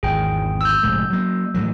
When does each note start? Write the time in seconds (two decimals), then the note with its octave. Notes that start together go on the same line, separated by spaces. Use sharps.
0.03 G#1 E2 G#4 G5
0.61 E6 G6
0.83 F1 A2 G#3
1.10 F#3 A#3
1.54 A2 E3 F#3